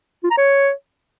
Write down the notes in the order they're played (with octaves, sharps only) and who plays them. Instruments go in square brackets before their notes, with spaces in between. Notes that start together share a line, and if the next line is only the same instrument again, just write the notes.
[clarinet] F4
A#5
C#5